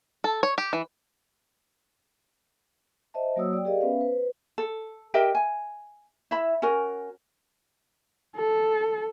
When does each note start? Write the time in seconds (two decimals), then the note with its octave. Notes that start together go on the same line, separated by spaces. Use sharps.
0.24 A4
0.43 C#5
0.58 G4
0.73 E3
3.14 C5 D#5 E5 A5
3.36 F#3 A#3 F#4 C#5 D#6 E6
3.53 D5 G5
3.65 G4 G#4 A#4 D5 D#5 F5
3.81 B3 C#4 B4 E5 F5
4.01 B4 C5
4.58 A4
5.14 G4 A#4 D#5 E5
5.35 G#5
6.31 E4 E5 B5
6.62 C#4 F#4 A#4 G#5
8.37 A4